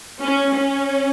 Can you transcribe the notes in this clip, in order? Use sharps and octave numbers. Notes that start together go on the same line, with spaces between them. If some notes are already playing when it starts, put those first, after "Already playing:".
C#4
C#4